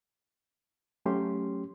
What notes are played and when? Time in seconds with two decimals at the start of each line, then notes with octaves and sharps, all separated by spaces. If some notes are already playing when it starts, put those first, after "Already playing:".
1.06 F#3 A3 C#4 G4 C6